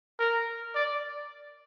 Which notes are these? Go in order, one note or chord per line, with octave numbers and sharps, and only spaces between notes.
A#4
D5